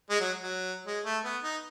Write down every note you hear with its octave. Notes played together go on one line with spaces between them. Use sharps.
G#3
F#3
F#3
G#3
A3
B3
D#4